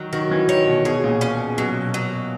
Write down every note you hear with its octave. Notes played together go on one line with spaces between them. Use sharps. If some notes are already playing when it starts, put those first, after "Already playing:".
Already playing: D#3 F#3
D#3 F#4
E3
D#3 C#5
B2
B2 G#4
A#2
C#4
B2 F#3
F#3